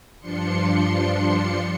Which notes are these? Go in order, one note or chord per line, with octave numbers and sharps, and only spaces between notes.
G2 F3 D4 C6 C#7